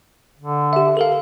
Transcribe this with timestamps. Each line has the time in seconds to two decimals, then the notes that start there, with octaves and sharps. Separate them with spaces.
0.39 D3
0.73 G4 E5
0.97 A4 A#4 F5